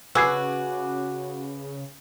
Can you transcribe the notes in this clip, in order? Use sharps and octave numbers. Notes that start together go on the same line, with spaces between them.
C#3 F#4 B4 G#5 D6 E6 G#6 C7